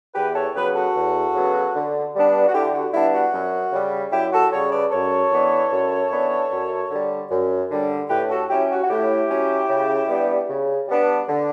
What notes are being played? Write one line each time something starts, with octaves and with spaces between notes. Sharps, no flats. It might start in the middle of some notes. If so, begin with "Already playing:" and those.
E2 G4 B4
A4 C#5
C#3 F#3 B3 G4 B4
F#4 A4
E2
C#3 F#3 B3
D3
G3 B3 D4
F#4
D3 E4 G4
F#4
G3 B3 D4 E4
F#4
F#2
C#3 G3
F#2 E4 G4
F#4 A4
C#3 G3 A4 C#5
B4 D5
F#2 A4 C#5
E3 B3 D4
F#2
E3 B3 D4
F#2
D3 G3
F#2
D3 G3
A2 G4 B4
F#4 A4
F#3 C#4 E4 G4
F#4
F#4
A2 E4 G4
F#3 C#4
C#3
G3 B3 D4
C#3
G3 B3 D4
D3